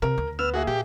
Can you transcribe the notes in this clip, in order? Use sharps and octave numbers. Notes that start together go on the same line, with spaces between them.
C3 A#4
D2
B3 E6 F6
A#3 F#4 G#4 E5
A#2 G4